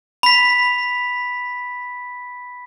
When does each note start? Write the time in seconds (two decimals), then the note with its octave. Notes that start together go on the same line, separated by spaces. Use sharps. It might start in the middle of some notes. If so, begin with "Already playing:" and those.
0.23 B5 B6